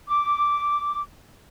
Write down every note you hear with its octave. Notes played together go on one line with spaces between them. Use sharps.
D6